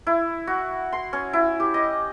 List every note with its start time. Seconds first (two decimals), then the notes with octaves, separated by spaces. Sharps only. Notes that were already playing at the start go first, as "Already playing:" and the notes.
0.07 E4
0.47 F#4
0.92 C6
1.13 C#4
1.33 E4
1.60 G4
1.74 D#5